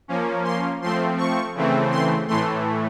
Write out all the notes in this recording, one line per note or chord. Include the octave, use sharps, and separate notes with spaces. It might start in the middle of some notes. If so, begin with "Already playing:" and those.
F3 A#3 C#4
C6
F3 A3 C4 C6
C#6
C#3 E3 A3 C4
C6
A2 E3 A3 C6